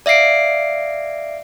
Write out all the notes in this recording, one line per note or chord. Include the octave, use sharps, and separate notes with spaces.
D5 E5 F5 C7 D7